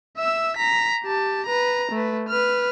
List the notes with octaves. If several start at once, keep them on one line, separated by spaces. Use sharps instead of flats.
E5 E6
A#5 B6
G4 A5
B4 A#5
A3 B4
B4 F6